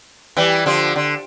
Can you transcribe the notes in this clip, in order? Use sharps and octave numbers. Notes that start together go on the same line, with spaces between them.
E3 G3
D3 F3
D3